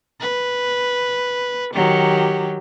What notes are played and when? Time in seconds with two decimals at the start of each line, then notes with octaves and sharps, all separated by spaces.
0.21 B4
1.73 D#3 F#3 G4